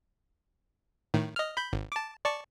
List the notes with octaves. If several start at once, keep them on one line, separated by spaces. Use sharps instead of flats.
A2 D#3
D#5 F6
B5 G6
G#1
A5 D6
D5 A5 C#6